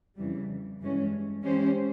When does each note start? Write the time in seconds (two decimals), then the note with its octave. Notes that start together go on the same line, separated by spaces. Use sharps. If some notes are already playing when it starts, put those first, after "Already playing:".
0.16 F2 C#3 E3 G3
0.80 G2 E3 G#3 C#4
1.42 E3 G#3 C#4 G4 C5